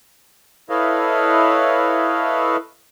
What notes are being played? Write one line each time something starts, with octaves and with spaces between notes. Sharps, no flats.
E4 A4 B4 C#5 D#5 F5